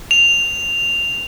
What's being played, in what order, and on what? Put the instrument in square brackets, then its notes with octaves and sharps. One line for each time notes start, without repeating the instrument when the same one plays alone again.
[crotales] F7